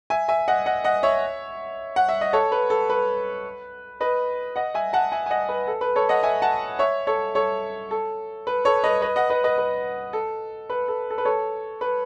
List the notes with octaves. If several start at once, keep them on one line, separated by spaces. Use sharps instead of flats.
E5 G#5
E5 G#5
D#5 F#5
D#5 F#5
D#5 F#5
C#5 E5
F#5
E5
D#5
A4 C#5
B4
A4
B4
B4 D#5
D#5 F#5
E5 G#5
F#5 A5
E5 G#5
G#5
D#5 F#5
B4
A4
B4
A4 C#5
D#5 F#5
E5 G#5
F#5 A5
C#5 E5
A4 C#5
A4 C#5
A4
B4
A4 C#5
B4 D#5
B4 D#5
D#5 F#5
B4 D#5
B4 D#5
B4
A4
B4
A4
A4
B4
A4 C#5
B4